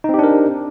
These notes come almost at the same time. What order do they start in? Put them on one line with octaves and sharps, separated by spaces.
D#4 C4 G4 D4 A#4